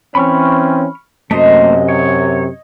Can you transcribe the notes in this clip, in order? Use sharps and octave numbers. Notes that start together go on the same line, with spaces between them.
E3 C4 C#4 B5 C#6 F6
F#2 C3 A3 A#3 C5 D#5
C#5